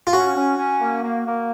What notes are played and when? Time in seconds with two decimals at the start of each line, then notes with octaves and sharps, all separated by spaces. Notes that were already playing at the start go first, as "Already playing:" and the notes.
0.07 F4
0.13 C#4 F#4
0.36 C#4
0.58 C#4
0.80 A#3
1.03 A#3
1.25 A#3